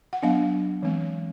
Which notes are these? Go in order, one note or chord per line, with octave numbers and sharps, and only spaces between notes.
F#5
F#3 B3 D4 F5
E3 G#3 C4